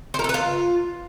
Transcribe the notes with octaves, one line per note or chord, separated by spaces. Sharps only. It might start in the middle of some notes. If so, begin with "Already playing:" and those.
C5
A#4
A4
B4
F4